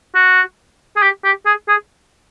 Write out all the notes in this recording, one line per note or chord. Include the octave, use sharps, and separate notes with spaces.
F#4
G#4
G4
G4
G#4
G#4